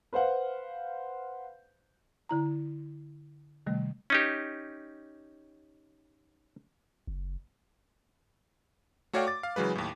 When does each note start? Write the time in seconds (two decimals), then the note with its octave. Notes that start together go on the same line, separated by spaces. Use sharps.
0.13 B4 C5 F5 F#5
2.29 D3 E4 A#5
3.67 C3 D#3 G3 A3
4.10 C#4 D#4 G4
7.07 F#1
9.13 A3 F#4 C#5 D5 F5 G5
9.27 D6 A6
9.43 F5
9.56 C#3 E3 F#3 G#3 B4
9.75 D#2 A2